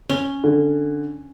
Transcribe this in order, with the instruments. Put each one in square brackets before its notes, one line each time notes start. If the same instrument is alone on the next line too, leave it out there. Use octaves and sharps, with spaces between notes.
[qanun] C#4 [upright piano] G7
[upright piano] D3